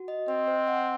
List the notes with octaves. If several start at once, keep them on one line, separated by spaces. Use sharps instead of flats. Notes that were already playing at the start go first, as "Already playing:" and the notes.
Already playing: F#4
D#5
C4 D#5
C5
F#5